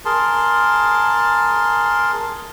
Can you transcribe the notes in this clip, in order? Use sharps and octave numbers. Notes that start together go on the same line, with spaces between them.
G#4 A#4 A5 C6